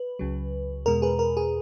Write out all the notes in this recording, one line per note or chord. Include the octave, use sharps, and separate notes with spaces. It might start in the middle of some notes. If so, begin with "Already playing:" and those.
Already playing: B4
C#2 C#3 F#3
E2 B2 G#3 A#4
G#4 B4
A#4
G#4